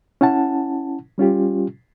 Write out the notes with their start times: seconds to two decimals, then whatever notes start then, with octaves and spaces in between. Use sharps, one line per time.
0.21 C#4 E4 F#5 A5
1.18 G3 C#4 F4 G4